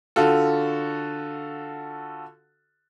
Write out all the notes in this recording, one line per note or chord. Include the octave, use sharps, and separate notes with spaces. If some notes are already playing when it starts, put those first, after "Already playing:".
D3 F4 F#4 A4